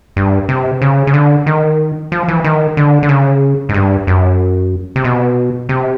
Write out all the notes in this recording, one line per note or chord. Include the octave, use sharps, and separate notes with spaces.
G2
C3
C#3
C#3
D3
D#3
F3
E3
D#3
D3
D3
C#3
G#2
G2
F#2
C3
B2
C3